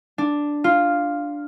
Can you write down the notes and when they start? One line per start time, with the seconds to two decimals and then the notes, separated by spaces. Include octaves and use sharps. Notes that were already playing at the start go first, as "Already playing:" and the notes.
0.18 D4
0.64 F4